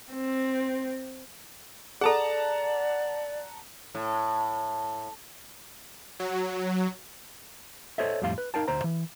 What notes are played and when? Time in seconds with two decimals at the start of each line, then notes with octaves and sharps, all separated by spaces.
0.13 C4
2.01 G#4 A4 D5 F#5 A5 A#5
3.95 A2
6.20 F#3
7.98 A4 C5 C#5 D#5 E5
8.22 F2 A2 G3 F5 C6
8.38 B4
8.54 D#4 A#4 F5 G5 A5
8.68 D2 C5 A#5
8.84 E3